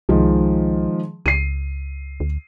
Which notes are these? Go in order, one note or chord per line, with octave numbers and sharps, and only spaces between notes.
C2 D#3 F3 G#3
C#2 C7 D#7
D2